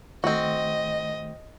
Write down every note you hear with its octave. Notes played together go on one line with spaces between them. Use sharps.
D#3 A3 C4 F#4 D#5